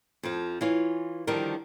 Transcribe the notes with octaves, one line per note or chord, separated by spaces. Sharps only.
F2 F3
E3 F4 C#5
D3 D#3 F3 G3 A4 A#4